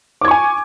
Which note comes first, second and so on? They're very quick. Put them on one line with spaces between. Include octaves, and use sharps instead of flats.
D6 G#6 C#6 G#5